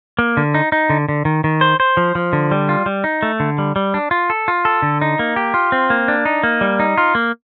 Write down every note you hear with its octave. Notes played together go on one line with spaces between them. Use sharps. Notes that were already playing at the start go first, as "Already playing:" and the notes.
A#3
D3
D#4
D#4
D3
D3
D#3
D#3
C5
C5
F3
F3
D3
G3
F4
G3
D#4
A3
D3
G3
G3
D4
F4
A4
F4
A4
D3
D#4
A#3
G4
F4
C4
A#3
D4
D#4
A#3
G3
D#4
F4
A#3